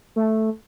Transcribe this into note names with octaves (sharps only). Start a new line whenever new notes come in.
A3